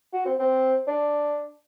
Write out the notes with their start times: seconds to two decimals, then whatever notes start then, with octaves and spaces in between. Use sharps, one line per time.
0.13 F#4
0.25 C4
0.39 C4
0.88 D4